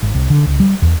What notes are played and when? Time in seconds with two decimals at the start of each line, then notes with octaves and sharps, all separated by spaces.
0.02 G#1
0.15 C2
0.30 D3
0.46 C#2
0.60 G3
0.82 E2